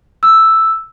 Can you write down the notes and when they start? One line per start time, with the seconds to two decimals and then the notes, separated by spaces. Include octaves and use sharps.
0.23 E6